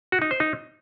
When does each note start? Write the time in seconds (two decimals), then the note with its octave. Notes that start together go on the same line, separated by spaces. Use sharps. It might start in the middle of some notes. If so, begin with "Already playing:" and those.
0.12 F#4
0.22 D#4
0.31 C5
0.40 D#4